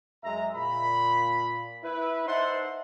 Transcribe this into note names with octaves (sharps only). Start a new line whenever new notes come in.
F#2 G#3 E5 A#5
A#2 B5
E4 B4
D#4 C5 E5 F#5 A5 C6